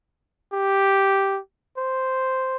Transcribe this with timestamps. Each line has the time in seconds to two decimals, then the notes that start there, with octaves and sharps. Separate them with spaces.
0.53 G4
1.78 C5